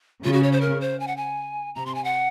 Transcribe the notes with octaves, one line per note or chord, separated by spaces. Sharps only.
C#3 F4
F#4
C#5
C5
A#4
C5
G#5
F#5
G#5
C3 A#5
C6
G#5
F#5